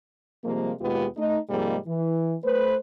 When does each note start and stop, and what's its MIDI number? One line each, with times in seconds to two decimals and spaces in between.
0.44 0.71 48
0.44 0.71 53
0.44 0.71 55
0.44 0.71 56
0.44 0.71 58
0.80 1.06 39
0.80 1.06 47
0.80 1.06 56
0.80 1.06 59
0.80 1.06 65
0.80 1.06 67
1.16 1.37 57
1.16 1.37 63
1.49 1.76 44
1.49 1.76 48
1.49 1.76 53
1.49 1.76 55
1.49 1.76 56
1.49 1.76 58
1.86 2.34 52
2.44 2.75 57
2.44 2.75 71
2.44 2.75 72